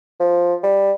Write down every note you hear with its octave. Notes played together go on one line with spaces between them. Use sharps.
F3
G3